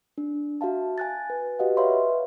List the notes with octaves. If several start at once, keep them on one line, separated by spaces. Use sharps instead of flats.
D4
F#4 E5 F5 A5
G#5 F#6 A6
B4
F#4 G4 B4 D#5 F5 F#5
B4 C#5 E5 F5 B5 C6